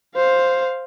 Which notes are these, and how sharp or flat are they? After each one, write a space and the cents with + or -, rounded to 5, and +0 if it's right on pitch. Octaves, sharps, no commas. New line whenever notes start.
C5 +0 F5 +0